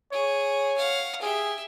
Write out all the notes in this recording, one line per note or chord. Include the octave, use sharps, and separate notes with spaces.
G#4 C#5
F5 F#5
G4 G#4 E5